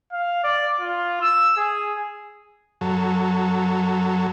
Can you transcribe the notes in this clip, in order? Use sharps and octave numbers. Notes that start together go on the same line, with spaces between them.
F5
D5
F4
E6
G#4
F#2 F#3 A4